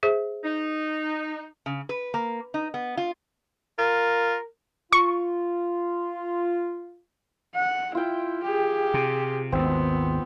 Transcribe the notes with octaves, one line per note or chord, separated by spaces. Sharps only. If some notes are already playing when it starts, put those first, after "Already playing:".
G#4 C5 E5
D#4
C#3
B4
A#3
D#4
B3
F4
F4 A#4
F4 C#6
F#5
E4 F4 G5
G4 G#4
C3
G#1 D#2 B3 C4